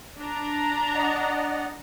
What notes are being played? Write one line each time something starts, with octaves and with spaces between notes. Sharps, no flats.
D4 A#5
D5 D#5 F#5